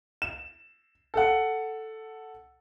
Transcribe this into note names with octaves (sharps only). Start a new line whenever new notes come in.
E7
A4 F#5